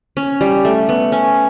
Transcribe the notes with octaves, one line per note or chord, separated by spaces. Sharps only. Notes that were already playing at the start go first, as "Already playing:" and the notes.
C#4
G3
A3
B3
C#4